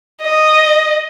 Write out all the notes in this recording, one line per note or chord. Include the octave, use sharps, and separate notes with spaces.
D#5